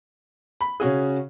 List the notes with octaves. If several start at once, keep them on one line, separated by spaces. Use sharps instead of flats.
B5
C#3 C#4 F#4 G#4